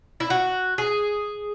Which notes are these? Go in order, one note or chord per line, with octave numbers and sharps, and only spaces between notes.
E4
F#4
G#4